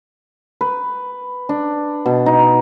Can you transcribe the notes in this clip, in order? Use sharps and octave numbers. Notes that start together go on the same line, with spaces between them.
B4
D4
B2
D#4